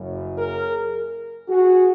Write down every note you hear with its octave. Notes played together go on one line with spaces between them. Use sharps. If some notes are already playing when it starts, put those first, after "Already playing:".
Already playing: F#1 F#2 C#3
G#4 A#4
F#4 G#4